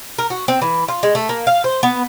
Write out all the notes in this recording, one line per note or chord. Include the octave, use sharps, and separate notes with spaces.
A#4
F#4
C4
E3
F4
G#3
A3
A#3
F5
C5
B3